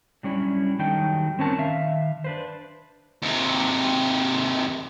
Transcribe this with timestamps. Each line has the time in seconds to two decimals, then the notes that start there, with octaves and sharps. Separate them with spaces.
0.23 F#3 G3 C#4 D4 E4
0.79 D#3 F#3 G3 D#4 A4 G5
1.39 C4 C#4 A#4 A5
1.58 D#3 E5 F5
2.24 D4 B4 C5
3.22 D#2 C3